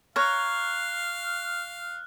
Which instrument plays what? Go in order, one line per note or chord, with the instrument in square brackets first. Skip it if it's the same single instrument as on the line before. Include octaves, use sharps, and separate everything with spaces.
[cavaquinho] C#5 A#5 [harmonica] F5 [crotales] F6 F#6